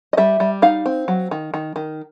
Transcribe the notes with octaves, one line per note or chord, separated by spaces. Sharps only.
D#5
G3 E5
G3
D#4 F5
C4
F#3
D#3
D#3
D#3